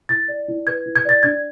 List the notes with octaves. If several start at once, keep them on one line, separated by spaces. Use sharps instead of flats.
E4 A6
D5
E4
B4 G#6
E4
G#6
D5 A6
D4 G#6